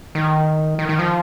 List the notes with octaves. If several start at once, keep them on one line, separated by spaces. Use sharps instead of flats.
D#3
D#3
D#3
F3